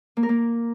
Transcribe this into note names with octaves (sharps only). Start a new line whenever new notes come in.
A#3
A#4
A#3